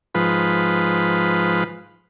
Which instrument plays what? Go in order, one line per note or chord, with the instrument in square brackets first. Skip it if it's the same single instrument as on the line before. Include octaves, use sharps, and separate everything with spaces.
[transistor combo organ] G#2 F3 B4